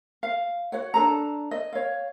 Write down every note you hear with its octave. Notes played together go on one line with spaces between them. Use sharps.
F5
F#4 C#5 F#5
D4 A4 A#5
D#5
C#5 F5